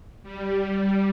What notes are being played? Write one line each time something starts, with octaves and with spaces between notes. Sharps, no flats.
G3